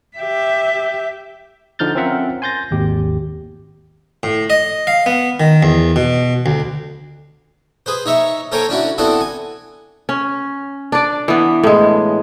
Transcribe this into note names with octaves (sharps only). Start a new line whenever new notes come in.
G4 E5
D3 F3 D#4 F6 G6 A6
C4 C#4 F4 A#4 E5 F#5
G#5 C6 G6 A6 A#6
G#1 D#2 G4
A2
D#5
F5
B3
D#3
E2
B2
D2
G#4 B4 C5
D#4 C#5 E5 C#6
A4 A#4 C5 C#5 G5 G#5
C#4 D4 E4 F#4
B3 C4 D4 E4 F#4 A4
G#5
C#4
D4 D5
E3 B3
A2 G#3